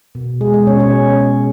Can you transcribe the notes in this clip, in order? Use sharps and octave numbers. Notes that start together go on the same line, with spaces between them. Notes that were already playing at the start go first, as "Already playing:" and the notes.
B2
G#3 G#4
G#3 G#4
B2 C#4 C#5
C#4 C#5